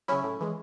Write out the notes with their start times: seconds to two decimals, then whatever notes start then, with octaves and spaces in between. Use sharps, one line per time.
0.08 C#3 F#3 C#4 E4
0.24 A2
0.40 E3 G#3